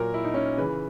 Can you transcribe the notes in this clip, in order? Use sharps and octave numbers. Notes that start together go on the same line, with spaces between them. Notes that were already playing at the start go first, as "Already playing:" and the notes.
Already playing: A#2 F#3 A#4
E4
D#4
C#4
C#3 E3 B4